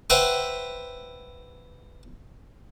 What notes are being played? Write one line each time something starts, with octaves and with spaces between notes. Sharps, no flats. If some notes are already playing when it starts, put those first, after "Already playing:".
B4 C5 E5 F#5 G5 A#5